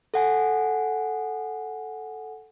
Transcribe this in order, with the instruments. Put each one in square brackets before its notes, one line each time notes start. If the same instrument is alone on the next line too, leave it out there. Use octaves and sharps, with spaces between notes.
[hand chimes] A4 F#5 G#5